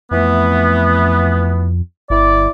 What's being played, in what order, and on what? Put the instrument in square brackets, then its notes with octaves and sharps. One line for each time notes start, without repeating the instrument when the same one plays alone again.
[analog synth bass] F2 [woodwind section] E3 A3 B3
[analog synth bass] G1 [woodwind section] E4 D5